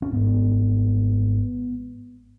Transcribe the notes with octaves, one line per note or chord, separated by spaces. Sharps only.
C#4
G#1 G#2 B3